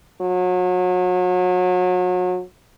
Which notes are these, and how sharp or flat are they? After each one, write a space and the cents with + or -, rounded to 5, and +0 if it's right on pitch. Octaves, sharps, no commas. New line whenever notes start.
F#3 -30